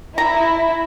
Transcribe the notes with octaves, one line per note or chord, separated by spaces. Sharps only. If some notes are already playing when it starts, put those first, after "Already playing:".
E4 A#5